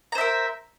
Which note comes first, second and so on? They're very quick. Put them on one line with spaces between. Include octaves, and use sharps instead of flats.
A#5 C5 E5 A#4